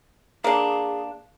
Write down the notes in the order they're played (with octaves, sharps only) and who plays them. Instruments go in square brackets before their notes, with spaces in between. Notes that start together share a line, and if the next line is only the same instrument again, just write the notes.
[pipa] A#3 D4 [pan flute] G#4